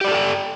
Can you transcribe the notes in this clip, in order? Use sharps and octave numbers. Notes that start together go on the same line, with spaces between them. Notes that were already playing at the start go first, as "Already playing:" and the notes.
G4 A4 B4 D5 G5